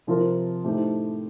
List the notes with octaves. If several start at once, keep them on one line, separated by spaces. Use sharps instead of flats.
C3 F3 C4 F4 A#4
A2 A3 D#4 G4 C5